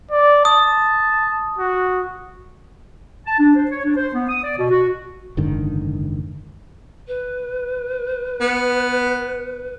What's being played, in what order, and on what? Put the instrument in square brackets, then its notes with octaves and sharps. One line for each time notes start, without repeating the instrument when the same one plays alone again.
[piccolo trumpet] D5
[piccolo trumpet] A5 [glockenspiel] D#6
[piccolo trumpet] F#4
[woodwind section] A5
D4
C5
C#5
D4
C5
B3
D#6
D5
B2
F#4
[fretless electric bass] F#1 G#2 D3 D#3
[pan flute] B4
[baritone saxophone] B3